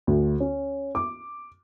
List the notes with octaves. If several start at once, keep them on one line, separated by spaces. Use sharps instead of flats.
D2
C#4
D6